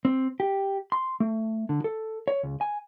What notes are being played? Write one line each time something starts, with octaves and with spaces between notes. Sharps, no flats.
C4
G4
C6
A3
D3
A4
C#5
C#2
G#5